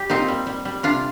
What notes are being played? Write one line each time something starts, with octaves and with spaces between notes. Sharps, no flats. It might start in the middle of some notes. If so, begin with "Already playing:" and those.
Already playing: G3 G4
A#2 C4 D#4
G3
G3
G3
C3 D4 F4